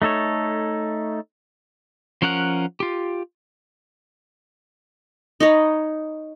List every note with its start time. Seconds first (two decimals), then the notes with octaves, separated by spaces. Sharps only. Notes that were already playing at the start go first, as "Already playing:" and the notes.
0.02 A3 D#4 A4 C#5
2.22 F3 C#4 A#4 F#5 F#6
2.80 F4 G4
5.40 D#4 C#5 D#5 B5